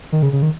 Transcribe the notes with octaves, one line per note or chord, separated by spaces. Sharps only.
D#3
C#3
C#3
D#3